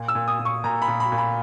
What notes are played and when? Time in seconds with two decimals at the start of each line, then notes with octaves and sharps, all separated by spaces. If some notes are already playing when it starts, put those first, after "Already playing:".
Already playing: A#2
0.08 E6
0.15 A#2
0.28 D#6
0.39 A#2
0.45 C#6
0.64 A#2 A#5
0.82 B5
0.88 A#2
1.00 B5
1.12 A#2
1.18 B5